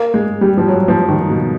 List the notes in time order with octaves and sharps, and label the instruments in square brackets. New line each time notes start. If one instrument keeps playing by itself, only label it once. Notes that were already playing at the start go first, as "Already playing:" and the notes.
Already playing: [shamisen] A#3
[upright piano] G#3
G3
F3
F#3
F3
D#3
B2